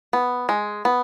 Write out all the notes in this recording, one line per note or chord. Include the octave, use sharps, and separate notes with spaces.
B3
G#3
B3